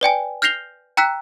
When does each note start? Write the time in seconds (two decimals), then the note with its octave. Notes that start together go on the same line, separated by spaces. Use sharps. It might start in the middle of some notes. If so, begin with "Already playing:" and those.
0.01 B4 D5 G5 G#5
0.42 F6 G6 A#6 C7 F7 G7
0.97 G5 A#5 E6 F#6 B6